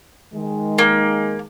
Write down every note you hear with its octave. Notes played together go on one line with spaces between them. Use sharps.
D#3 G#3
A#3